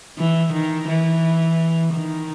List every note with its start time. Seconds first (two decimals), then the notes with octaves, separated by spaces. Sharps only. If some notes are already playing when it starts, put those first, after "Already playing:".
0.18 E3
0.53 D#3
0.89 E3
1.94 D#3